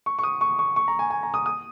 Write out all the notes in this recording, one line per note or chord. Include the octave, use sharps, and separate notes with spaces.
C#6
C#6
D#6
C#6
C#6
C#6
A#5
G#5
G#5
A#5
D#6
D#6